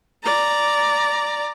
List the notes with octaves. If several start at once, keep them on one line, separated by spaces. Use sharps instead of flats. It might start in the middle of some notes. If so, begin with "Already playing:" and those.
D5 A#5